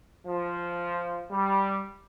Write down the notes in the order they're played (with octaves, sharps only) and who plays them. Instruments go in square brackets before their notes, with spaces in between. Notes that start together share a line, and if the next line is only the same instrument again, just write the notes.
[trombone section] F3
G3